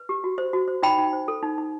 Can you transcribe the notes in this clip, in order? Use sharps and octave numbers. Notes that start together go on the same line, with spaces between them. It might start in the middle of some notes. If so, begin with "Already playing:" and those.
Already playing: B4
G4
F#4
C5
F#4
C5
D#4 G5 B5
D#4
C5
A4
D#4
D#4